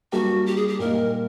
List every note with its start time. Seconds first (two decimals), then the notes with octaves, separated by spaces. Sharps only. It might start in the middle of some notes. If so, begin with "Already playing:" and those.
0.12 G3 A#3 D4 F#4 G4 A#4
0.46 G4
0.57 G#4
0.68 G4
0.79 A#2 G3 A#3 D#4 A#4